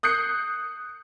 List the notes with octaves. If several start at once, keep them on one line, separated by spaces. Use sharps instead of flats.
D#6 F#6 G6 C7 C#7